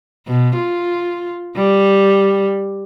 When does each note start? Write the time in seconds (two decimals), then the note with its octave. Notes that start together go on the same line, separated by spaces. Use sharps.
0.28 B2
0.56 F4
1.56 G3